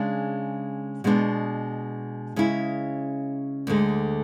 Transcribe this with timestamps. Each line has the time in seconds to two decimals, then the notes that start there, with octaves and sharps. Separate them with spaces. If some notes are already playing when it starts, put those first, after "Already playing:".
Already playing: C#3 G#3 D4
1.04 B2 G#3 B3 D4
2.36 C#3 G#3 C#4 E4
3.67 D2 D3 G#3